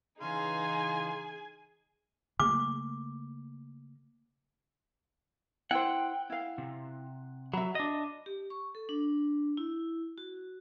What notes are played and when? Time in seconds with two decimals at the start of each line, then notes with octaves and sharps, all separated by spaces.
0.21 C#3 E3 D#4 G#4 F5 G#5 C6
2.40 C#3 A3 A#3 D6
5.71 E4 C5 F#5 G5
6.30 E4 F5
6.58 C3
7.54 F#3 E5 B5
7.75 D4 D#5
8.26 G4
8.50 C#6
8.75 A4
8.89 D4
9.57 E4
10.18 F#4